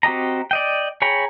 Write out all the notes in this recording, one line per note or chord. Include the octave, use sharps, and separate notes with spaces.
C4 F#4 G4 D#5 A#5
D5 D#5 G5
G#4 C#5 G5 A#5 B5